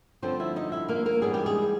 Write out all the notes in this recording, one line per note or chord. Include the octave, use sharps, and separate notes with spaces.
G2 D3 F3 C4 C5
E4 E5
D#4 D#5
E4 E5
A#3 A#4
A#3 A#4
G#2 E3 G3 B3 D4 G#4
G4
G#3 G#4